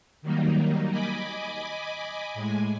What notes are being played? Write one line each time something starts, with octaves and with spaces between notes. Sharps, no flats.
D#3 F#3 G3 A#3 D#4
D#5 G#5 B5 D6
A2 G#3 G#5